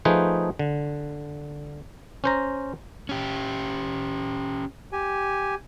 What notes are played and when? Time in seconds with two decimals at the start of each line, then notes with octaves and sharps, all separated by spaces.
0.05 F3 A3 D#4 G#4 B4 C5
0.59 D3
2.24 C#4 C5 A#5
3.09 C#4 G4
4.92 G4 G#5